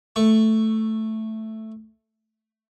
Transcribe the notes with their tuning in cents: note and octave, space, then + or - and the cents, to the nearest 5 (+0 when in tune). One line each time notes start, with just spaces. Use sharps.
A3 +0 C#6 +0